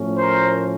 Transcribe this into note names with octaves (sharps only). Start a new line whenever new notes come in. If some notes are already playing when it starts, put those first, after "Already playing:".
Already playing: A2 F3 A3 C#4
A#4 C5